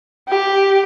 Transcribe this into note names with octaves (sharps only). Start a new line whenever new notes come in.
G4